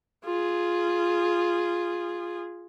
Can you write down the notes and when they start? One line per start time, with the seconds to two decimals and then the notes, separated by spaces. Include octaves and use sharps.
0.25 F4 G#4